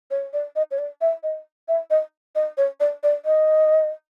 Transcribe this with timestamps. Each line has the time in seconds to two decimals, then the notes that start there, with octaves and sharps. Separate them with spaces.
0.11 C#5
0.33 D5
0.56 D#5
0.71 C#5
0.78 D5
1.01 E5
1.23 D#5
1.68 E5
1.90 D#5
2.35 D#5
2.57 C#5
2.80 D5
3.03 D5
3.25 D#5